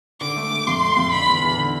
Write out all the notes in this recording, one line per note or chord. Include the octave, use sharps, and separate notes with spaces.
D3 D6
A3
A3
F2 C6
A3
F2
D3 B5
E2
E2
D3